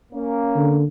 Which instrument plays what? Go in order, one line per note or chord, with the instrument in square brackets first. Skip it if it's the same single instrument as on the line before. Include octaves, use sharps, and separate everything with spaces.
[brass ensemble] A#3 C#4
[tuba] D3